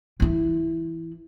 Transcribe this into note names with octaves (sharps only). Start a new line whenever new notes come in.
E3 E4